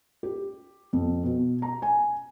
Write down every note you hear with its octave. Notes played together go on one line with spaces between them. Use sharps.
G4
F2
B2
A#5
G#5